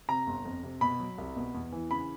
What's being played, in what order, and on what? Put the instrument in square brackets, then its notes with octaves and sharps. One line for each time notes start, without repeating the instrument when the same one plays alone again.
[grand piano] C3 A#5
G1
F2
C3
B2 B5
F#3
C2
B2
E2
E3
C#3 B5